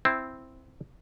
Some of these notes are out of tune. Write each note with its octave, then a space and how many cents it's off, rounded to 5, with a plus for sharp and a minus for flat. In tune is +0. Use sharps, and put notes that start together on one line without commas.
C4 +0 E4 +0